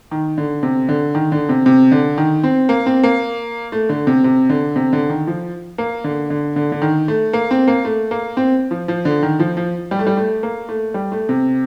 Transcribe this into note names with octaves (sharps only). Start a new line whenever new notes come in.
D#3
D3
C3
D3
D#3
D3
C3
C3
D3
D#3
C4
A#3
C4
A#3
A3
D3
C3
C3
D3
C3
D3
D#3
F3
A#3
D3
D3
D3
D3
D#3
A3
A#3
C4
A#3
A3
A#3
C4
F3
F3
D3
D#3
F3
F3
G3
A3
G3
A3
A#3
A3
G3
A3
C3